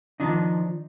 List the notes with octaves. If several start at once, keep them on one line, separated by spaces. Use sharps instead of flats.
D#3 F3 D4 D#4